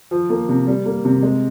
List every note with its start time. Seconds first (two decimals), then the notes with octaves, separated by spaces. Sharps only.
0.11 F3
0.30 A#3
0.49 C3
0.67 G3
0.86 A#3
1.05 C3
1.23 G#3